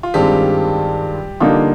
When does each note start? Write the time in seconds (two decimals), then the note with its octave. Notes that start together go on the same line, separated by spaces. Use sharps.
0.03 F4
0.14 G2 D#3 G3 G#3 C4 F4 G4
1.40 D3 F3 G3 A#3 D#4 F4